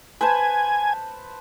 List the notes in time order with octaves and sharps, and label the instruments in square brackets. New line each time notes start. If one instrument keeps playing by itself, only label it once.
[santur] B4 C5 A5 [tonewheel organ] G#5